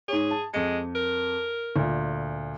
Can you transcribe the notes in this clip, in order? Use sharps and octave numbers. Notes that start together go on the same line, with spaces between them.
G#2 G#4 C#5
A5
F2 G#3 C#7
A#4
D2 A#2